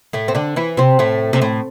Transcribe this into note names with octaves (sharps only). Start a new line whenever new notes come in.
A2 A3
C4
D3 D4
E3 E4
C3 C4
A2 A3
C3
A2